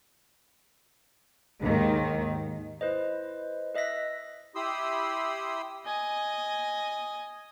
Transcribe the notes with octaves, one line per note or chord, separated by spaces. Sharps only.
D#2 G#2 D#3
E4 B4 C5 D#5
B4 D#5 E5 F#6 A#6 B6
E4 G4 B5 C6 D#6 E6
D#5 G#5